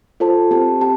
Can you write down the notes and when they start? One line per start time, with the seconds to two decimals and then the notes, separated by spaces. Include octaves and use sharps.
0.20 F4 A4 C5 A5
0.51 C4 G4 C5 A5
0.81 C4 G4 A5